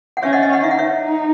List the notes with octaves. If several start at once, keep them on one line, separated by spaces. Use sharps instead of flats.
F#5
C#4 C#5 E5
D#5 F#5
D#5 F#5
D#5 F#5
D#4 E5
F#5
C#5 E5
D#4